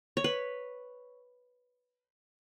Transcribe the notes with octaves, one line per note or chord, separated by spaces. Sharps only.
C#5
B4